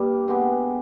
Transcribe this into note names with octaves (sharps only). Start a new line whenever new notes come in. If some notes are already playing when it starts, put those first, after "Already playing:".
Already playing: G2 G3 A#3
B2 G#3 B3 G4